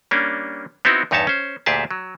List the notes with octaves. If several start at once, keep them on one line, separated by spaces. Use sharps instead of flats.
G3 A#3 C#4 D4
B3 C4 D#4 E4 F#4
E2 G2 D#4 C#5 E5 A5
C#4 C5
D2 A#2 G4 G#4 E5 A5
F#3